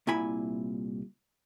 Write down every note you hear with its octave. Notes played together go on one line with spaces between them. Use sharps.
C2 A#2 E4 G#5 B5